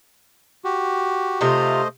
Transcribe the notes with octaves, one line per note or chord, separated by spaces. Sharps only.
F#4 G4
C3 A3 F4 C5 D#5